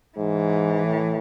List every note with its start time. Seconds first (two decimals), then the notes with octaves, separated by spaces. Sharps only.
0.17 G#2 E3
0.84 A2